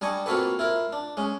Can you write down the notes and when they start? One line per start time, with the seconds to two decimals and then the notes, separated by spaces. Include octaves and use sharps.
0.01 G3 D4 D#5 G#5 C#6
0.26 A#3 C4 F4 F#4 A4 B4
0.59 E4 F4 A#4
0.92 D4
1.17 G#3 C#4